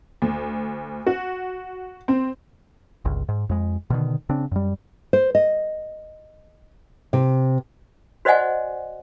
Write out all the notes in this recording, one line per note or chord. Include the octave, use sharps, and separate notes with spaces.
D2
F#4
C4
G1 C#2
G#2
F2 G#3
B2 D3 D#3
C#3 C4 D4
F#2 G3
C5
D#5
C3
F#4 C5 D5 D#5 F#5 G#5